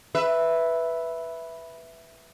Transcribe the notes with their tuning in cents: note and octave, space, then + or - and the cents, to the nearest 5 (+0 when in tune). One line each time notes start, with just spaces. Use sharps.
B4 +0 E5 +0